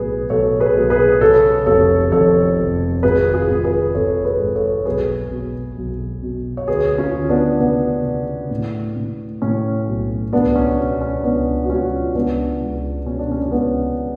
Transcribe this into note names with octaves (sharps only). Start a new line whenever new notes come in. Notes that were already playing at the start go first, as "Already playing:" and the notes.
Already playing: B1 A2 G#4 B4
B1 A4 C#5
G#4 B4
B1
G#4 B4
C#3 A4 C#5
F1 A4 C#5
F2 A4 C#5
F1
G#1 G#4 B4
F4 G#4
G#1
G#4 B4
G#1 A4 C#5
G#4 B4
G#2
A4 C#5
B1 G#4 B4
B2
B1
B2
C#5
D2 G#4 B4
C#4 F4
D2
B3 D4
C#3 B3
C#3
A2
A2
A2 C#4
B1
C#2 B3 D4
C#4
B2
C#4
C#2 B3 D4
F#4
C#2 C#4 F4
C#2 B3 D4
C#2
B2 C#4
D4
C#4
C#4
C#2 B3